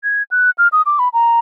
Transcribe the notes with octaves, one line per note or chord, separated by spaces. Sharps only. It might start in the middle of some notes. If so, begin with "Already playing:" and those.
G#6
F#6
F6
D#6
D6
B5
A#5